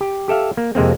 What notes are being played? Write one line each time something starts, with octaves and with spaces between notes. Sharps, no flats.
G4
G4 A4 E5 F5
A#3
F2 C3 G#3 A#3 C4